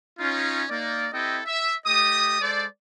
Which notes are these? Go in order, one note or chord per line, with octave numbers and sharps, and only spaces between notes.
C#4 D#4 F4
A#3 D#4 D5
C4 E4 G4 A4 D#5 G5
E5
A3 G4 D#5 D#6
G#3 A4 C5 D5